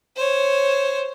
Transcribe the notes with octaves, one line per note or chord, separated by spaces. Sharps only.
C5 C#5